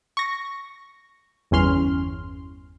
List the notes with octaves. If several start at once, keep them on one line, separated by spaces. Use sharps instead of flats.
C#6 A#6
G1 E2 C#4 C6 F6